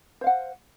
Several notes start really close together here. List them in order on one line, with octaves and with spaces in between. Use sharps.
C5 F5 F#5